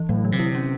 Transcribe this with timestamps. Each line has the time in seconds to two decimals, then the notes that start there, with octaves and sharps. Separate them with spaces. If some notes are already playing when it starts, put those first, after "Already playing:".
Already playing: E3
0.09 A2 F#3
0.25 D3
0.32 C3
0.39 E4
0.55 C#4